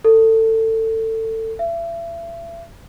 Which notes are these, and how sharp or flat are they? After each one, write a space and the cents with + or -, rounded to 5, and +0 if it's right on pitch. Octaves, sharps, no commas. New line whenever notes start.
A4 +25
E5 +35